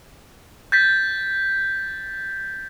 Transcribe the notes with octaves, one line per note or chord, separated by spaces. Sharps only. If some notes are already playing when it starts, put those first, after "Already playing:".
G6 A6 B6